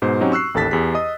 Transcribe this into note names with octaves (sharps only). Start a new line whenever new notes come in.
G#2 B2 C5 C7
F#3 C4 C#4 D#4 F#4 G4
C#6 E6 F#6 C7
A1 D#2 A4 A5 A6 B6
E2 G4 G#4 B6
D#5 D#6